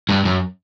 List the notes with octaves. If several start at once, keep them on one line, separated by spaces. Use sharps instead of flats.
G2
F#2